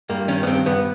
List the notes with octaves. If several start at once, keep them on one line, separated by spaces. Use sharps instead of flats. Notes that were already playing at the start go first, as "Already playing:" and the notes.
G2 A#3
D#3 C#4
B3
G2 C4
G2 B3